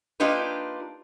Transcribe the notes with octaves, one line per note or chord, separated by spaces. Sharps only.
A#3 D4 D#4 F4 G4 B4